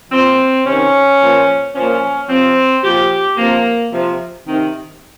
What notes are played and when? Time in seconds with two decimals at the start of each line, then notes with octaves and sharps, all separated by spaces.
0.12 A#2 F3 C4
0.66 C3 D#3 C#4
1.21 A#2 F3
1.75 A#2 F3 C#4
2.30 C3 F3 C4
2.84 A#2 F3 G4
3.38 C3 F3 A#3
3.92 C3 F3
4.47 C3 D#3